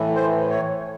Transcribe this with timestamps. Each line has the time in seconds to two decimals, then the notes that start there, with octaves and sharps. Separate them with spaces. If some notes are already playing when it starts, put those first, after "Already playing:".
Already playing: A2 E3
0.15 C5
0.50 C#5